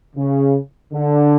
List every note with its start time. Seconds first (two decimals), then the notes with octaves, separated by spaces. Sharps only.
0.16 C#3
0.93 D3